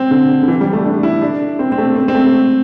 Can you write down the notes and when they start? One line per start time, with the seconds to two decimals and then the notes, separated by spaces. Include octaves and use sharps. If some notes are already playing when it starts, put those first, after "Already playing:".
Already playing: C4
0.11 D3
0.43 D3
0.48 E3
0.60 G3
0.73 A3
0.85 D4
1.03 E4
1.22 D4
1.59 C4
1.72 C4
1.78 A3
1.96 C4
2.08 C4
2.14 A3